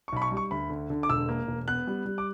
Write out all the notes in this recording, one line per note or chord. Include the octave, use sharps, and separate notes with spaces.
C#6
B1 B5
C#6
G3
C#6
D2 B5
D3
D3
D6
E1 E6
A#3
E1
B3 F#6
G3
G3
D6